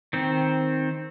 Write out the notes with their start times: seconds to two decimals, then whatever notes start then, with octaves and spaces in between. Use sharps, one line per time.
0.13 D#3 C4